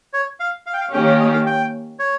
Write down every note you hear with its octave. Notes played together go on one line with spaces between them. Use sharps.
C#5
F5
F5
G5
F5
D#3 A#3 C#4 G4 G5
F5
D#5
F5
G5
C#5